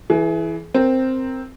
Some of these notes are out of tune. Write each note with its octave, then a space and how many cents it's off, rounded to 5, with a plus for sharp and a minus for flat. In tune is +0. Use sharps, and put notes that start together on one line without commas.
E3 +0 G#4 +30
C4 +0 A#4 +0